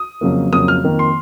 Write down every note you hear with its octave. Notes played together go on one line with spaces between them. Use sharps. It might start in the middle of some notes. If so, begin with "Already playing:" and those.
Already playing: D#6
F2 C#3 F#3 A#3
F2 C#3 F#3 A#3 D#6
F6
F2 D#3 A#3
C6